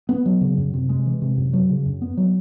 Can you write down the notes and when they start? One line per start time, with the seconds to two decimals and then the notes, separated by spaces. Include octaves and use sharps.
0.09 B3
0.26 F#3
0.41 C#3
0.57 F#2
0.74 C3
0.89 G#3
1.06 E3
1.22 C3
1.37 F#2
1.53 F#3
1.69 C#3
1.86 F#2
2.02 B3
2.17 F#3